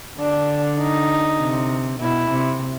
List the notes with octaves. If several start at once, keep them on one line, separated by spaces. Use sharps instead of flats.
D3 D4
D#4
C3
B2 E4
C3